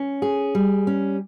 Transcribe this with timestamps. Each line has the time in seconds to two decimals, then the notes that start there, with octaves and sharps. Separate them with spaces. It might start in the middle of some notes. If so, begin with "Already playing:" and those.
Already playing: C#4
0.22 G#4
0.55 G3
0.87 C#4